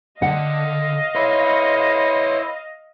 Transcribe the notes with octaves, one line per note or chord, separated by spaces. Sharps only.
D3 D#5 F5 F#5
E4 B4 C#5 C6